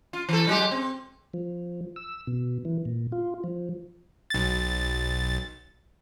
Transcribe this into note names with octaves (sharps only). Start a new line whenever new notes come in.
F4
E3 A4
F#3 G#3 G4
C4
F3
E6
B2
E3
A#2
F4
F3
B1 A6